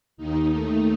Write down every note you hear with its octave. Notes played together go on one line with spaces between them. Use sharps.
D#2 D#3 D#4
A3